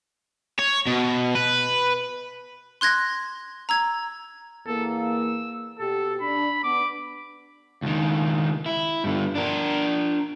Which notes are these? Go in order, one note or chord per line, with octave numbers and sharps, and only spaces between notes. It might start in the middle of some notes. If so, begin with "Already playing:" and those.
C#5
B2
B4
C6 F#6 G#6 A#6
A#5 E6 G#6
E2 A#3 A4
E6
B2 G4 A4
D4 B5
B3 D4 D6
C#2 D#3
E4
G2 D3
D4 A#4